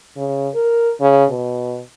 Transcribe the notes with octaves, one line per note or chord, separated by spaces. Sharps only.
C#3
A#4
C#3
B2